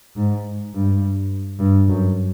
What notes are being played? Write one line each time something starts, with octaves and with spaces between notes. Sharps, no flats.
G#2
G2
G2
F#2